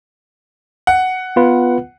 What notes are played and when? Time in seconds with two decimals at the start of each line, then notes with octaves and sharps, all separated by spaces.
0.87 F#5
1.36 B3 F4 B4